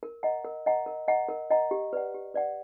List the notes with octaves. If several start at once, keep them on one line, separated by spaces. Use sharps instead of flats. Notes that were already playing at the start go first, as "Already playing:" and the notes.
A#4
D#5 F#5 A#5
A#4
D#5 F#5 A#5
A#4
D#5 F#5 A#5
A#4
D#5 F#5 A#5
G4
B4 D5 F#5
G4
B4 D5 F#5